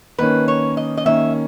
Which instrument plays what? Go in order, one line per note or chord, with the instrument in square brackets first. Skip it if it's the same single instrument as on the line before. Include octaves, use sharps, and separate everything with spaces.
[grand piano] D#3 A#3 C#4 [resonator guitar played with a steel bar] B4
[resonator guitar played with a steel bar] C#5
D#5
D#5
[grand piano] D#3 A#3 C#4 [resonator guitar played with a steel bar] E5